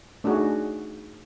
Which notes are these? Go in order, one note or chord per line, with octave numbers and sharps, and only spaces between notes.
A3 D4 D#4 F#4 G#4